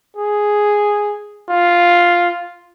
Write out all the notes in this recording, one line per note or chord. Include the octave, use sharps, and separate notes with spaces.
G#4
F4